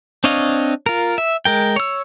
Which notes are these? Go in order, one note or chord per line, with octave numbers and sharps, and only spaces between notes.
C4 D4 C#5 D#5 F5
F4 A#4
E5
G#3 A#4 G5
C#5 E6